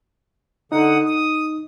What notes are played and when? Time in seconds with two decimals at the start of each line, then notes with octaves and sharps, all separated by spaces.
0.72 D3 D#4 F#5 D#6
1.06 D#6